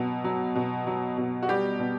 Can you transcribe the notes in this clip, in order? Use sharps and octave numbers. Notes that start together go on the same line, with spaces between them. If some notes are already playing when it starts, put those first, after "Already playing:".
Already playing: B2 F#3
F#3
B2
F#3
B2
F#4
G3 G4
B2